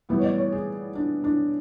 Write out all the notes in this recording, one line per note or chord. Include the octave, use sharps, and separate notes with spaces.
A2 E3 G3 B3
C#5
D5
C#5
G#4
D4
D4